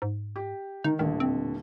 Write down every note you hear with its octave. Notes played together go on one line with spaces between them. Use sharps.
G#2
G4
D#3 D#4
D#1 A1 D3 D#3
C4